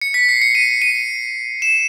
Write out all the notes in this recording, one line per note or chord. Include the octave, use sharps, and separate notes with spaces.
C#7
B6
C7
C#7
D#7
D#7
E7